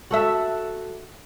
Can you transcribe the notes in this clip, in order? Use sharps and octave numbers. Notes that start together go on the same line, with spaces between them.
F#4 A4 E5